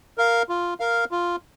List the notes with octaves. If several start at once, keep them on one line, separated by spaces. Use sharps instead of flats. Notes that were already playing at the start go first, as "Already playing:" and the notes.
A#4 F5
F4
A#4 F5
F4